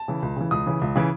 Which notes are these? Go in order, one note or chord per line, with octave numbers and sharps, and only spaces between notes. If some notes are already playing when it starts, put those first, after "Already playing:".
Already playing: A5
C#3 E3
C#2
C#3 E3
C#2 D#6
C#3 E3
C#2
C#3 E3